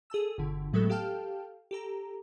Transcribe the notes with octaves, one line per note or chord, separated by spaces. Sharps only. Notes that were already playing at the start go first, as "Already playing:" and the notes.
G#4 A4 A5 E6
G1 B2 D3
A2 F#3 G#3 A3 B3 A4
G4 A4 F5 G5 A5 F6
G4 A4 A#5